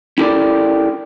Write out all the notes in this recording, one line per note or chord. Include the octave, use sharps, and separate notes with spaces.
C#4 E4 G4 A4 A#4 D5